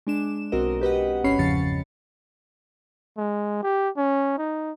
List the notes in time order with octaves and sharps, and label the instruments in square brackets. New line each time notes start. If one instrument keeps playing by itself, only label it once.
[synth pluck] G#3 D4 E7
B1 C4 F#4 A#4 D#5
G4 B4 D#5 F#5
G1 G2 C#4 C#5 B5 C7
E2 G#2 C#3 F3 A6 C#7
[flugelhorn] G#3
G4
C#4
D#4